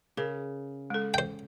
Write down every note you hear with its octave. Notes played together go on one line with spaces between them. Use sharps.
C#3 A#4
G#3 A4
C5 G5